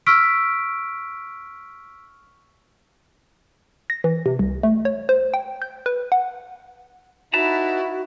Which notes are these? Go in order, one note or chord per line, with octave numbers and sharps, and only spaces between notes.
C#6 E6 F6 B6 D7
A#6
E3
C3
C2
A3
C#5
C5
G5
G6
B4
F#5
D#4 E4 F#4 B4 A5 A#5